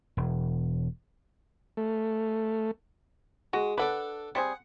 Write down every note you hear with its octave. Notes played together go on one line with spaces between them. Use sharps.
E1
A3
G#3 F#4
D4 A4 B4 D5 F#5
G3 C4 G#4 F#5